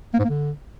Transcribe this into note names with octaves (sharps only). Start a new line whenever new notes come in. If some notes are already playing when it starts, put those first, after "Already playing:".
A#3
G#2
A#3
D3